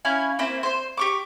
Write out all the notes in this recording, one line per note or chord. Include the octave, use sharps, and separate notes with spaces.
C#4 E4 F5 G#5
A#3 C4 E4 C5
C5 C6
G4 C#6 D6